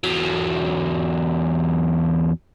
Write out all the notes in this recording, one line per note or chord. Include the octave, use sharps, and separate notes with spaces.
E2 F#3